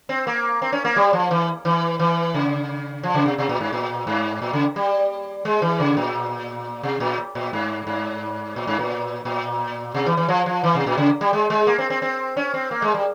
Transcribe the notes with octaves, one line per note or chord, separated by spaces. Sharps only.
C4
A#3
C4
C#4
A#3
G3
F3
E3
E3
E3
C#3
F3
C#3
C3
C3
A#2
G#2
A#2
G#2
A#2
C#3
G3
G#3
E3
C#3
A#2
C3
A#2
A#2
G#2
G#2
A#2
G#2
A#2
A#2
C3
E3
E3
F3
F3
E3
C3
A#2
C#3
G3
G#3
G#3
A#3
C4
C4
C4
C#4
C4
A#3
G#3
G3